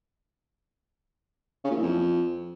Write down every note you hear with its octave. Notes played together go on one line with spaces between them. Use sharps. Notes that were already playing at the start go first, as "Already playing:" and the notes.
C#3
A#2
E3
F2